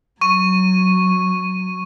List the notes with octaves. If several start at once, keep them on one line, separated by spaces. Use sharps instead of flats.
F#3 C#6 D#7